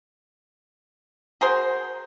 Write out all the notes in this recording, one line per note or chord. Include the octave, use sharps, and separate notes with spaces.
F#4 G#4 A#4 C5